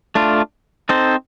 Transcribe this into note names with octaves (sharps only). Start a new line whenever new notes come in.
A3 D4 F4
C4 D#4 A4 C5